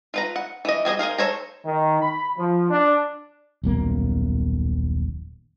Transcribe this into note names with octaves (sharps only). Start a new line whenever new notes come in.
F4 B4 A#5
F#5
E3 D#5
G3 G#4 C5 D#5
G#4 A#4 C5 F5
A4 C5 C#5 G#5 A#5
D#3
B5
F3
D4
D#1 B1 A#3